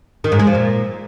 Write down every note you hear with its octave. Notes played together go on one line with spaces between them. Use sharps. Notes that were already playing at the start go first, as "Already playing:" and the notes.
D#3
G#2
G#3
F3
A#2